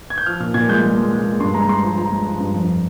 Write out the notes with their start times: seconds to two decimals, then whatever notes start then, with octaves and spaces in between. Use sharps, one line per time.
0.10 G#6
0.18 G6
0.26 F3 F6
0.40 A#2 F6
0.54 A#2 G#6
0.69 G#3 G6
0.83 G#3
0.97 G#3
1.12 G#3
1.26 G#3
1.40 G2 C6
1.54 G#3 A#5
1.68 G#3 C6
1.83 F3 C6
1.97 F3 A#5
2.11 G#3
2.26 F3
2.40 G2
2.54 F2